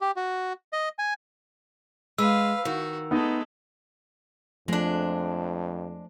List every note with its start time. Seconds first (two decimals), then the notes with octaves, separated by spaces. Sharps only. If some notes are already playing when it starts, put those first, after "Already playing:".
0.01 G4
0.16 F#4
0.73 D#5
0.99 G#5
2.18 G#3 B4 F5 E6
2.65 D#3 F#4
3.11 G#3 A3 B3 D#4
4.68 F2 F3 G#3 A3 D4